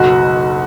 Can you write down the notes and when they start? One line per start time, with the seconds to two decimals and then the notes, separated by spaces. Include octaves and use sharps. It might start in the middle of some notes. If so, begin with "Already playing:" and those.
Already playing: F#1 B1 F#4